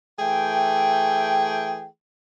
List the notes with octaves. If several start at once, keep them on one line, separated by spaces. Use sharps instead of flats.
E3 A3 G#4 G5